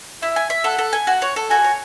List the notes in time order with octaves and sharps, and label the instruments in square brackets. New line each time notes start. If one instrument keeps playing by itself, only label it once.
[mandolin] E4 [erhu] E5
[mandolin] G#5
E5
[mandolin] A4 [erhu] F#5
[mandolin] A4
G#5
[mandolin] F#4 [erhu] F#5
[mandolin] C#5
A4
[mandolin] F#4 [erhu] G#5
[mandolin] C#5